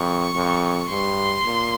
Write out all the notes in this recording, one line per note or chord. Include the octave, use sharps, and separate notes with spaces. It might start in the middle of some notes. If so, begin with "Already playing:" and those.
Already playing: F2 C#6
F2
G2 C6
A#2